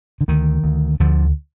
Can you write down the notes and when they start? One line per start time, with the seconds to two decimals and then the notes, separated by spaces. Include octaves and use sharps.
0.21 D3
0.28 D2 D#3
0.64 D2
1.00 D2 D3 F3